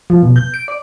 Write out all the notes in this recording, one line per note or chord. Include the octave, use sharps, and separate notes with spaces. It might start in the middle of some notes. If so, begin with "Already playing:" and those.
F3
B2
G6
D7
D5